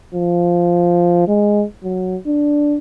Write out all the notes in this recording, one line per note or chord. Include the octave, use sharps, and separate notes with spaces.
F3
G#3
F#3
D4